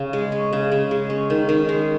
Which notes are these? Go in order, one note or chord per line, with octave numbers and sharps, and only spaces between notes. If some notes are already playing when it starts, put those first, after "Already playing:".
Already playing: C#3
G#3
C#4
C#3
C#3
G#3
C#4
D#3
D#3
G#3